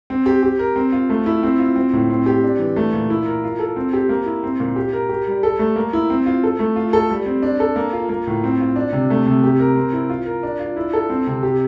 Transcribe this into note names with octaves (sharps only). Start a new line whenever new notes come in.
C4
G4
G4
A#4
C4
F4
A3
E4
C4
F4
C4
A2
C4
G4
D4
E3
A3
A#2
E4
A#4
F4
A4
C4
G4
A#3
E4
C4
A#2
G4
A#4
G4
G3
A4
A3
A#3
E4
C4
F4
A4
A3
F4
A4
G3
C4
D4
A4
A#3
F4
A#3
A2
C4
F4
D4
C3
A3
C3
G4
A#4
C4
E4
F4
A#4
D4
F4
E4
A4
C4
C3
G4